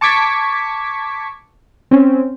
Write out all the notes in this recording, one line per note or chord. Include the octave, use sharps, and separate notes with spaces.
A5 C#6 D6 G#6 B6
C4 C#4